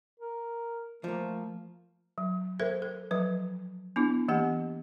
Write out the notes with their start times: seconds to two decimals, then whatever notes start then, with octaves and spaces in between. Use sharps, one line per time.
0.20 A#4
1.04 F3 A3 A#3
2.18 F#3
2.60 A4 A#4 C5 E5
2.82 A4
3.11 F3 F#3 B4
3.96 B3 D4 E4
4.28 E3 A#3 B3 G4 F#5